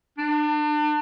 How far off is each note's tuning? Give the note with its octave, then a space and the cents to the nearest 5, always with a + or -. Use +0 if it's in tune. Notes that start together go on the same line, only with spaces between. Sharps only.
D4 +35